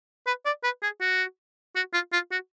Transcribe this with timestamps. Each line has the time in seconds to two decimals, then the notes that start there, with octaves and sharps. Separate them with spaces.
0.27 B4
0.45 D5
0.63 B4
0.83 G#4
1.01 F#4
1.75 F#4
1.93 F4
2.13 F4
2.31 F#4